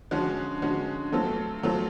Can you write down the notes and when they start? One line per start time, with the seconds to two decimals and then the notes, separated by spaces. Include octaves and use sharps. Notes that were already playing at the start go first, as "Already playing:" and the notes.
0.11 D3 F3 G#3 C#4 F#4
0.62 D3 F3 G#3 C#4 F#4
1.12 F#3 A3 C4 F4 A4
1.63 F#3 A3 C4 F4 A4